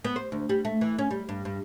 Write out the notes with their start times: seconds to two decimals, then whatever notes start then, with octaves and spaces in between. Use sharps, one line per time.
0.04 B3
0.16 C5
0.32 D2
0.49 G3
0.65 A3
0.81 E3
0.99 C#4
1.11 G3
1.29 G2
1.45 G2